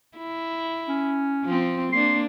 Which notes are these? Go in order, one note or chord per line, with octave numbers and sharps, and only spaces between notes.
E4
C#4
F3 C4
A#3 D4 C6